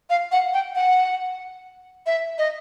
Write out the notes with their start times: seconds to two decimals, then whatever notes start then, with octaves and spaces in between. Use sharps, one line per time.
0.10 F5
0.32 F#5
0.53 G5
0.75 F#5
2.06 E5
2.38 D#5